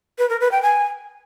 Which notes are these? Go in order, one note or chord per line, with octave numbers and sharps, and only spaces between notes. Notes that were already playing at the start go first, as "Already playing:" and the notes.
B4
A#4
B4
G5
G#5